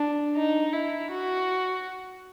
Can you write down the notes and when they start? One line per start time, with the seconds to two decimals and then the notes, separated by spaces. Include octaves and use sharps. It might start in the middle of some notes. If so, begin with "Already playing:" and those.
Already playing: D4
0.36 D#4
0.73 E4
1.11 F#4